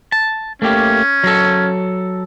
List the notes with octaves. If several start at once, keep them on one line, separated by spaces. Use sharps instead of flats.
A5
A3 A#3 C#4 G4
F#3 A4